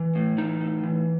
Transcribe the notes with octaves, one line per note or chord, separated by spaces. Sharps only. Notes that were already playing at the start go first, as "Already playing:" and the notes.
Already playing: E3
A2
E3 D#4
A2
E3